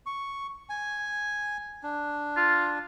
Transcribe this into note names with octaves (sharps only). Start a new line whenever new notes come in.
C#6
G#5
D4
F4